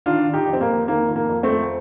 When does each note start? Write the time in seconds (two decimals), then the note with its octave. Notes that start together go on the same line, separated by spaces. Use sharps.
0.06 D#3 D4 F4
0.27 D#3
0.33 D#4 G4
0.47 F2
0.53 C4
0.61 A#3
0.68 F2
0.88 D#3 A#3
1.09 F2
1.16 A#3
1.29 F2
1.43 A3 C4
1.50 F2